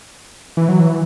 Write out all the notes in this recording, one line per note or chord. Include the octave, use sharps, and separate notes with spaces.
E3
F#3
E3